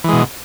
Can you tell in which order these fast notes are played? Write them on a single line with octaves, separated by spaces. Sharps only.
E3 G#3 B2